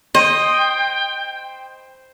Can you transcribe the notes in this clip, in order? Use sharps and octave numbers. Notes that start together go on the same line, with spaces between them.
C5 D#5 G5